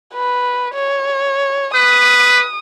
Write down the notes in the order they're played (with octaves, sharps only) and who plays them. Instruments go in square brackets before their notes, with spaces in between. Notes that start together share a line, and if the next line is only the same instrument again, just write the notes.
[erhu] B4
C#5
[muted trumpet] B4 [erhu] D#6